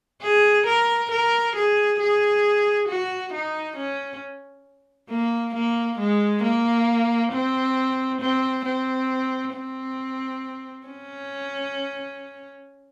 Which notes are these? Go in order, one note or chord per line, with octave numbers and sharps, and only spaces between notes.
G#4
A#4
A#4
G#4
G#4
F#4
D#4
C#4
A#3
A#3
G#3
A#3
C4
C4
C4
C4
C#4